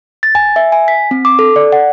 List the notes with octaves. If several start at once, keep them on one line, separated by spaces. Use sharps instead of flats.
A6
G#5
E5
G#5
B6
C4
D6
A4
D5
F#5